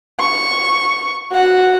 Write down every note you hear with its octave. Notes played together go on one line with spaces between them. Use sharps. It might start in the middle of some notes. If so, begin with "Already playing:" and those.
C#6
F#4 F#5